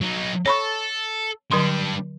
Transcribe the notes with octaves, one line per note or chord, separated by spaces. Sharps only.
F#3 D#4
A4 C#5 B5 C#6
D3 F#3 G3 D4 C6